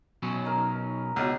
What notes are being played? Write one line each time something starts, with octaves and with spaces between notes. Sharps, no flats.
B2 F#3 C#4
D#4 A#4
C#2 B2